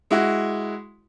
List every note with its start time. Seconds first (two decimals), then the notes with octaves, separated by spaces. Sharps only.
0.11 G#3 E4 F#4